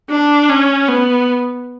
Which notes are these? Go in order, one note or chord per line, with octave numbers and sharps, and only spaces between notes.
D4
C#4
B3